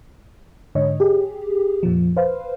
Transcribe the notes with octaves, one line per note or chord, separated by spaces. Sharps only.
G#2 D3 C#5 D#5
G4 G#4
F2 A#2 F3
B4 C5 F5